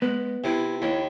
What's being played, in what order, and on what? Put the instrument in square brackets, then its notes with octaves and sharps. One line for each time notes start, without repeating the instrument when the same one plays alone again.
[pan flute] G#3 [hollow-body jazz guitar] B3
[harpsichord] C3 [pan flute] E4
[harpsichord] D#2 [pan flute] E4